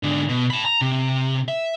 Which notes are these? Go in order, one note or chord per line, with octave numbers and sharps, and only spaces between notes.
G#2 D3
B2
A5 B5
A#5
C3
E5